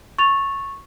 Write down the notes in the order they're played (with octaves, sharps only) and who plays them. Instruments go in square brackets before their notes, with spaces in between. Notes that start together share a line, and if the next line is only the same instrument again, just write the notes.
[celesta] C#6 A6 F7